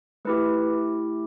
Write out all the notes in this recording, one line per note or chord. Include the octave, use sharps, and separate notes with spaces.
A3 E4 G4 B4